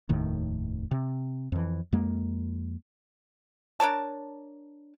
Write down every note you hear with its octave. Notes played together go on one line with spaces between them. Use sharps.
F1 D#2 A2 D#3
C3
F2 E3
F2 G#3 A#3
D4 A#4 C#5 A5